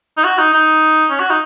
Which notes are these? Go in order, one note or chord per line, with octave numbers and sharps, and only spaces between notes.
D#4
F#4
D#4
D#4
C#4
F#4
D#4